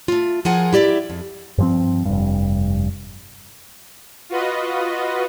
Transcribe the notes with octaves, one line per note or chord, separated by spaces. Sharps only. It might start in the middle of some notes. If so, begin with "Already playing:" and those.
A3 F4
F3 F4 G#4 A#4 F#5 G#5
E4 G4 D5 E5
F2
G2 F3 C4
F1 G2
F4 F#4 B4 D#5